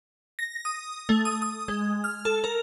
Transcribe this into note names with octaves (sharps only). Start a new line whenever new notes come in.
A#6
D#6
A3
D#6
D#6
G#3
F6
A4
A#4